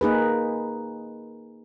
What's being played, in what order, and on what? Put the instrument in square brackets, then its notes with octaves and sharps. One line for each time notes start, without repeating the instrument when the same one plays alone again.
[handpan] A#3 D#4 G#4 B4